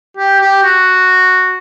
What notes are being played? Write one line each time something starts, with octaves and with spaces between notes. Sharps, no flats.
G4
G4
F#4